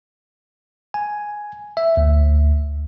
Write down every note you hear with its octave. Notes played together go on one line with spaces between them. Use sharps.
G#5
E5
D2